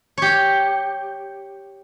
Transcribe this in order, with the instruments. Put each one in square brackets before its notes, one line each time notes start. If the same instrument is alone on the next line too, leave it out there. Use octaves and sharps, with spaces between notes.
[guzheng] G4 C#5